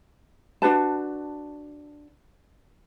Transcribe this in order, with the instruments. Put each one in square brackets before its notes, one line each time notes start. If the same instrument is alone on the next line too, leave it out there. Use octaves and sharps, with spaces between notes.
[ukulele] D4 F#4 B4 A5